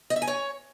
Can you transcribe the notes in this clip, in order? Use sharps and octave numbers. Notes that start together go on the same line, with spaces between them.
D#5
E5
G#5
C#5